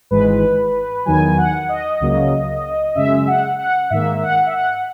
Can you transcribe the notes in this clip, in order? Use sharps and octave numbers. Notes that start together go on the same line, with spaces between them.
G#1 G#2 E3 G#3 B4
E2 D#3 F#3 G#5
F#5
D#5
C#2 C#3 F#3 A#3
F#2 C#3 G#3 E5
F#5
F#5
G#2 D#3 A#3 E5
F#5
E5
F#5